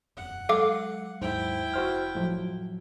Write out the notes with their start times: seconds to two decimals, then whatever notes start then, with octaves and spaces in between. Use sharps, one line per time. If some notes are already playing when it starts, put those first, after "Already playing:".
0.17 E1 F#2 F#5
0.49 F#3 G#3 A4 F5 D6
1.21 D#2 G#2 F#3 E4 C5 G5
1.74 F1 F#4 C5 F6
2.15 A2 F3 F#3